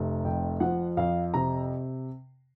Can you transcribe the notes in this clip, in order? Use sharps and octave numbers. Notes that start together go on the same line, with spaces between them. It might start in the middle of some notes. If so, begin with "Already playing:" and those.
Already playing: F1 C3
F2 G5
F3 F#5
F2 F5
C3 A#5